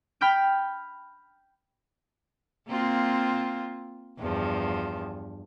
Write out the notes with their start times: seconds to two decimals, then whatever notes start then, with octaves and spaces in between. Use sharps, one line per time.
0.21 G5 B5 F6 G6 D7
2.68 A#3 C4 F4
4.19 E2 G2 F3